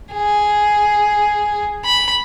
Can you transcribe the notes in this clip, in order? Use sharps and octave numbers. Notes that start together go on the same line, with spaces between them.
G#4
B5